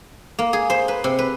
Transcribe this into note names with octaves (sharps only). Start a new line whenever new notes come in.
A#3
G#4
C5
B4
C3
B4